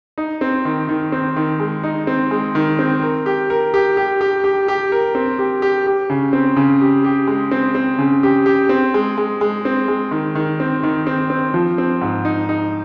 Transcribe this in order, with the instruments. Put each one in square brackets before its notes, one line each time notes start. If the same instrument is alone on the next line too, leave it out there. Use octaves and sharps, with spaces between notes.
[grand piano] D#4
C4
D#3
D#3
C4
D#3
G#3
D#4
C4
G#3
D#3
C4
A#4
G4
A#4
G4
G4
G4
G4
G4
A#4
C4
G4
G4
G4
C#3
C4
C#3
G4
G4
G#3
C4
C4
C#3
G4
G4
C4
G#3
G#3
G#3
C4
G#3
D#3
D#3
C4
D#3
C4
C4
F3
C4
G#2
D#4
D#4